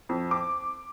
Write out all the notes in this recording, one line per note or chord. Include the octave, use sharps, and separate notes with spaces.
F2
D6